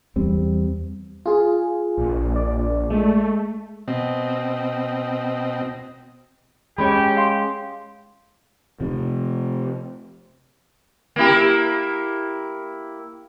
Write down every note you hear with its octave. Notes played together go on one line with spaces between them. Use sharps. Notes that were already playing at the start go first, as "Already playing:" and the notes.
E2 G3 C4
F4 G#4
A#1
D5
G#3 A3
B2 C4 D#5
G#3 C#4 G4 C#5 B5
F5 C6
C3 F3
A#3 E4 G4